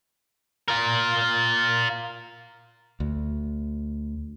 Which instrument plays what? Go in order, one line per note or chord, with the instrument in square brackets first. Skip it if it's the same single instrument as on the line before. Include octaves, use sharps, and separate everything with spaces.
[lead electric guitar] F4 A#4
[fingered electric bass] D2